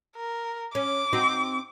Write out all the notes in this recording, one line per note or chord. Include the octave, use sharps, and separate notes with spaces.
A#4
C#4 D6
C4 D#4 F#4